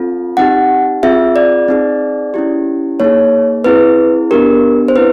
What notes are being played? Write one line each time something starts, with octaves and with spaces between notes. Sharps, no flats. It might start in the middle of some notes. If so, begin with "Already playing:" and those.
Already playing: C4 F4 A4
C4 D#4 G4 F#5
C4 F4 G#4 E5
D5
C4 D#4 G#4
C#4 E4 G4
A#3 D#4 G#4 C#5
C4 E4 G#4 B4
B3 D4 G4 A#4
C5
C4 E4 B4